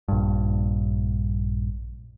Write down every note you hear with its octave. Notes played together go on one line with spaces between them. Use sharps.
A#1 G2